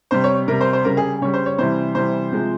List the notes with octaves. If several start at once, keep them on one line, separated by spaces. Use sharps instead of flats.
C3 G3 C5
C#5
C3 G3 A#4
C5
C5
C#3 G3 A#4
G#4
C#3 G3 C#5
C5
C#5
C3 E3 G3 C5
C3 E3 G3 C5
C3 F3 G#3